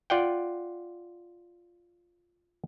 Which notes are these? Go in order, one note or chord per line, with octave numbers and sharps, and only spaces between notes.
F4 D5 F#5 G5